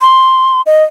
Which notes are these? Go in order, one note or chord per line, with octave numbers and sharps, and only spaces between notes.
C6
D#5